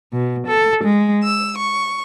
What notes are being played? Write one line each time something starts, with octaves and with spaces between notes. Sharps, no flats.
B2
A4
G#3
E6
C#6